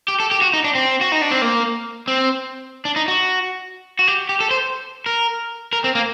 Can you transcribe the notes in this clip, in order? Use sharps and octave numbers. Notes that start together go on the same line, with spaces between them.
G4
A4
G4
F#4
D#4
D4
C4
F#4
D#4
D4
C4
A#3
C4
D4
D#4
F#4
F#4
G4
G4
A4
C5
A#4
A#4
C4
A#3